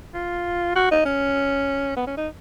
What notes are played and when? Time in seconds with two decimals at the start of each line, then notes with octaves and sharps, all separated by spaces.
0.14 F4
0.75 F#4
0.91 D#4
1.05 C#4
1.97 B3
2.07 C#4
2.17 D#4